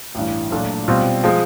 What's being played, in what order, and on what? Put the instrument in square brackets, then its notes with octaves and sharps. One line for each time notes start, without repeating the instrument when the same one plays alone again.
[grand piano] A1 G2 E3
A#2 F#3 A3 D4 F4
B2 G3 C4 F4
F3 G#3